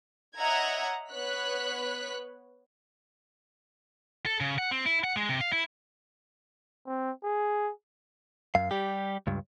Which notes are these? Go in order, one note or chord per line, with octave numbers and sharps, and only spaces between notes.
C#5 D#5 E5 F#5 A#5 G#6
B3 B4 C#5 F#6 B6
A4
C#3
F#5
C4
E4
F#5
G#3
C3
F5
E4
C4
G#4
F#2 F5
G3 G4
C#2 G2